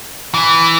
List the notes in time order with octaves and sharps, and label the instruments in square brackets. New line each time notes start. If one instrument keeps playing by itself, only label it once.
[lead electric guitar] E3